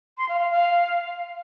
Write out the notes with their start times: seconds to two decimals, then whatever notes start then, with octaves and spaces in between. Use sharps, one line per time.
0.18 C6
0.29 F5
0.40 F5
0.51 F5